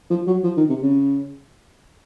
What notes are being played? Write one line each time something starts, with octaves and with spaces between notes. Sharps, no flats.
F3
F#3
F3
D#3
C3
C#3